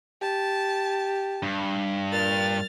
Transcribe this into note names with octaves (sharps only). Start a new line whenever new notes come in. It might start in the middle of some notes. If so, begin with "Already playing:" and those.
G4 A5
G2
A#2 F6 A6